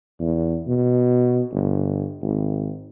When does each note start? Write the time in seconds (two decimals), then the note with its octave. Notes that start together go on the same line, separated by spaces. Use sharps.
0.19 E2
0.67 B2
1.52 G1
2.22 G#1